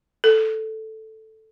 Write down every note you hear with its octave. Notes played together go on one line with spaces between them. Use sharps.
A4